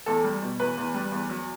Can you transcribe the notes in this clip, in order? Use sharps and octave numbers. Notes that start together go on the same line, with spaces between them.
E2 A4
G3
B2
E2 B4
E2
G3
E2
F#3